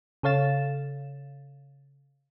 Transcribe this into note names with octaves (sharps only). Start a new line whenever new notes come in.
C#3 A4 C#5 F5 A6 E7